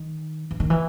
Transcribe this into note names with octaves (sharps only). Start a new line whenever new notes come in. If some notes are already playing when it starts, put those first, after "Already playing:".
Already playing: D#3
E3
D#3
E3